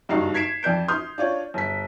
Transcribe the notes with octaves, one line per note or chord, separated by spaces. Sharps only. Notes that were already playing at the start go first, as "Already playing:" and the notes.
F#1 G2 D#4 F#4 C7
G#6 B6 C7 D7 E7
F2 D5 G6 D7
C6 D#6 F6 G6
D4 F4 C#5
G1 B6